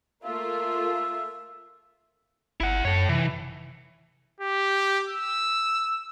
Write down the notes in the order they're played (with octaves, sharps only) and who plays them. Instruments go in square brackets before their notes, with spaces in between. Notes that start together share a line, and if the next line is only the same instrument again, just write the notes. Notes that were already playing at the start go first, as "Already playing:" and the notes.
[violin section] A3 A#3 F4 [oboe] E5
[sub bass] G1 [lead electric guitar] E4 F#5
[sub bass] F#2 [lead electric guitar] A4 C#5
[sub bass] C3 [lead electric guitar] E3
[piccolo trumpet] G4
E6